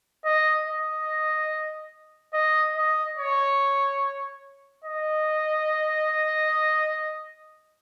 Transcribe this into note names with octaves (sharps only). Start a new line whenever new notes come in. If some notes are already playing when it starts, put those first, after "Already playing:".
D#5
D#5
D#5
D#5
C#5
D#5